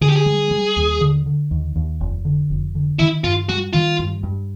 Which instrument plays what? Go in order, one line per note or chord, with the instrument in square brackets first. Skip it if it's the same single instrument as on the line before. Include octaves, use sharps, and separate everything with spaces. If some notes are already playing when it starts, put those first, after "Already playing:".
[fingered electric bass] D3 [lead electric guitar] G#4
[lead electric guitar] G4
G#4
[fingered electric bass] G3
G3
D#2
D3
D3
D#2
D#2
F1
D3
F1
D3
[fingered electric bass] D#3 [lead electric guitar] E4
[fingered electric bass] G2 [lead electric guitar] F4
[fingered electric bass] G3 [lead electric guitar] F#4
[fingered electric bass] D#3 [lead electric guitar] F4
[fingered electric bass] G2
G2